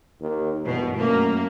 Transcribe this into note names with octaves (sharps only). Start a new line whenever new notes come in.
D#2
E2 G2 B2
F#2 A3 A#3